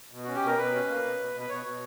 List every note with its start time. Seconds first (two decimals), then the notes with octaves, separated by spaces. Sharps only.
0.11 B2
0.24 C#4 F#4
0.35 G4
0.43 B2 A#4
0.58 B2 B4
0.74 C#4
0.89 A#3
1.03 B2
1.19 B2
1.34 B2
1.40 B4
1.49 B2 C#5
1.65 B2